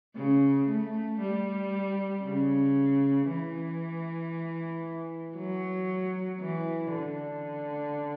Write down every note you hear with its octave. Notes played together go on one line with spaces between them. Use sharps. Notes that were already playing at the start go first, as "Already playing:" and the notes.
C#3
A3
G3
C#3
E3
F#3
E3
D3